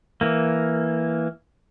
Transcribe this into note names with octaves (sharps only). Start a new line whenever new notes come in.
E3 A#3